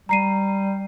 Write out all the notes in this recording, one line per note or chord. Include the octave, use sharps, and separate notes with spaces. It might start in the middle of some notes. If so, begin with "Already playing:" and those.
G3 A#5 C7 D#7